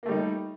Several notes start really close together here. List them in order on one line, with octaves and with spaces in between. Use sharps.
A#3 A3 G3 D#4